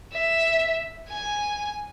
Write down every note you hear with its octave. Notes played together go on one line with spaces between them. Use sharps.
E5
G#5